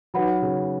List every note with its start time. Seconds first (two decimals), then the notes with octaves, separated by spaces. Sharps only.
0.14 F#3 D#4 F#4 B4 F#5 B5
0.42 C#3